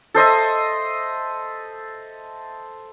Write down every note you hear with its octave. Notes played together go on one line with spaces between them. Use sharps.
A4 C5 D#5 E5